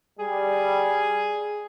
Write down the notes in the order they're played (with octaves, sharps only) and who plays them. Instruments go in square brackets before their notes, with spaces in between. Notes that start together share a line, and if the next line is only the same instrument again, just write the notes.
[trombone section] G3 [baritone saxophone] G#4